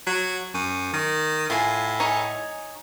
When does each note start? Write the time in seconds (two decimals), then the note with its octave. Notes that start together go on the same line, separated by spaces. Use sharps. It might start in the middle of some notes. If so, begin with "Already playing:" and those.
0.07 F#3
0.55 F#2
0.93 D#3
1.50 A2 F4 G#5
2.00 D#4 C#5 G#5